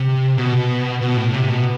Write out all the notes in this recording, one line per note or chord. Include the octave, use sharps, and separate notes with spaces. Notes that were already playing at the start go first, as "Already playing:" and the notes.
Already playing: C3
B2
B2
A2
C3
B2